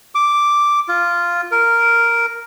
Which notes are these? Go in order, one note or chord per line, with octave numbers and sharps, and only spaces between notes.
D6
F4
A#4